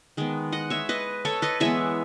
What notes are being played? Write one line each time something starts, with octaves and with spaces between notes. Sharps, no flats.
D#3 G#3 B3
D#5 F#5
C#5 E5
B4 D#5
A4 C#5
B4 D#5
E3 G#3 B3 C#5 E5